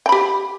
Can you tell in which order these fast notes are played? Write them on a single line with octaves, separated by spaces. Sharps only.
G5 B5 G4